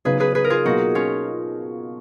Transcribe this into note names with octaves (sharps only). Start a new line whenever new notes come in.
C#3 F#3 B3 D#4 G#4 B4
G#4 B4
G#4 B4
A#4
F4 G#4
B2 F#3 A#3 D#4 F#4
C#4 F4